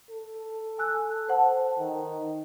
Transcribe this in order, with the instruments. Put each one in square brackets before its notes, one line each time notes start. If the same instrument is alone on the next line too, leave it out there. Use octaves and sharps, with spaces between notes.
[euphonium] A4
[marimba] G#5 E6 F#6
C5 F#5 A5
[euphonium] D#3